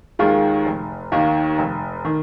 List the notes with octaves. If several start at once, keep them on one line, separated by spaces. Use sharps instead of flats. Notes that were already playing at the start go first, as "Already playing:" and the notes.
D#2 D#3 G#3 F4
F1
D#2 D#3 A#3
F1
D#3